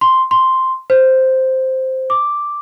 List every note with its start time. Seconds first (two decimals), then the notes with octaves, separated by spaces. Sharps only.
0.01 C6
0.31 C6
0.90 C5
2.10 D6